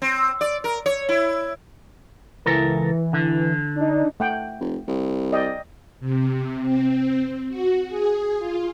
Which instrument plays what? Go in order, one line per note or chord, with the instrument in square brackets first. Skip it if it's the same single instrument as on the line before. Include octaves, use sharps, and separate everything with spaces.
[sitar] C4
D5
A#4
C#5
E4
[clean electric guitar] C#2 A4 A#4 [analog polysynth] E3
[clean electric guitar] D3
[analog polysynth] D4 D#4
[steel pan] A3 F#5 G5
[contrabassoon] F1
C2
[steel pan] D5 D#5 G5
[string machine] C3
C4
F#4
G#4
F4